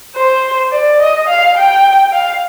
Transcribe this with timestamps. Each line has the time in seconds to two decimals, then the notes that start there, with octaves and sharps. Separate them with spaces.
0.15 C5
0.72 D5
1.00 D#5
1.28 F5
1.57 G5
2.13 F5